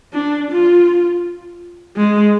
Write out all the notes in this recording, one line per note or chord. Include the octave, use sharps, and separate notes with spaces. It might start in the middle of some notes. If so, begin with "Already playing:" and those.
D4
F4
G#3